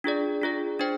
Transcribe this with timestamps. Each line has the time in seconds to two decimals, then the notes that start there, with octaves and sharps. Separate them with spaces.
0.04 D4 F4 G#4 D5
0.42 D4 F4 G#4 D5
0.79 D4 G#4 C5 G5